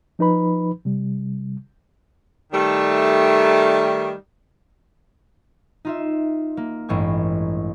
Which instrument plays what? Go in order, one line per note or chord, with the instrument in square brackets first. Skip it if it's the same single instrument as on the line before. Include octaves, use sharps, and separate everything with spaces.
[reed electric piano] F3 D#4 B4 B5
C3 G3
[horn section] D#3 G3 A3
[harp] D#4 F4 E5
A#3
A1 G2 E3 G#3 G5 C#6